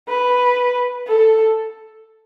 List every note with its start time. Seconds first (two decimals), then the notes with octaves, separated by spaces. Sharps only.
0.08 B4
1.07 A4